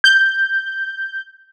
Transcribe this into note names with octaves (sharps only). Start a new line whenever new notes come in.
G6